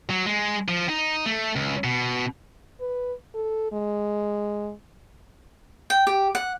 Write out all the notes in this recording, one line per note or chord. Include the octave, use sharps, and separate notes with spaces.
F#3
G#3
F3
D#4
A3
C#2
B2
B4
A4
G#3
G5
G4
F#5